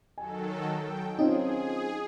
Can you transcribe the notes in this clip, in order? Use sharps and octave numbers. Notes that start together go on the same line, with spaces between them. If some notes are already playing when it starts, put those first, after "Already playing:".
D#3 F#3 A4 G#5
G5
C4 C#4 D#4 F4 G#4